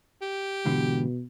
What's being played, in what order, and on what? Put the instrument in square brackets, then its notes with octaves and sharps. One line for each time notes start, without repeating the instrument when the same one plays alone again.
[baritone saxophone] G4
[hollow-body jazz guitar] G#2 D3 E3 [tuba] B2